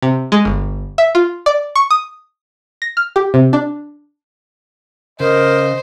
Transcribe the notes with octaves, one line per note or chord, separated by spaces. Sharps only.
C3
G#3
G1
E5
F4
D5
C#6
D#6
A#6
F6
G4
C3
D4
C#3 A#4 C5 D#5